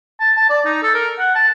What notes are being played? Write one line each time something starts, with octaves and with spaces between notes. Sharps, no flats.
A5
A5
D5
D#4
A4
A#4
F#5
A5